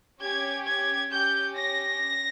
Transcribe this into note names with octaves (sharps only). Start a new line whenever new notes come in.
C#4 G4 G#6
G#6
C#4 G4 G6
A#6